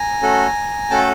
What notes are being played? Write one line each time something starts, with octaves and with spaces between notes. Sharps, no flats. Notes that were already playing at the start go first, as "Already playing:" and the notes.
Already playing: G#5 A#5
A3 C#4 F#4 A4
A3 C#4 F#4 A4 G5 A5